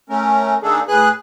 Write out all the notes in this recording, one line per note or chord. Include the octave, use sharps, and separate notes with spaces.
A3 C#4 A#4
D#3 A#3 D4 D#4 G#4 A4
A2 G#4 B4 G#5 F#6